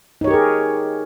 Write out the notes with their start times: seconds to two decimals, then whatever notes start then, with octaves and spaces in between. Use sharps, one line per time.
0.21 D#4
0.24 C#5
0.27 G4
0.31 A#4
0.34 G#4